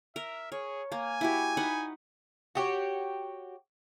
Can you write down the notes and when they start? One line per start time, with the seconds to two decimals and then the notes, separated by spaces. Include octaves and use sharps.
0.16 A#4 E5
0.52 G#4 C#5
0.92 A#3 G#5
1.21 E4 F#4 G4
1.57 D#4 B4 F#5
2.55 F#4 G4 C#5